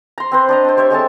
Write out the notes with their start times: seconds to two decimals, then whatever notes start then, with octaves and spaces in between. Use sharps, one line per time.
0.18 A#5 C6
0.32 C4 B4 C5
0.49 D4 D#5 A#5
0.65 D4 C5
0.77 G4 C5 C#5 E5
0.90 G#3 C4 A4 A5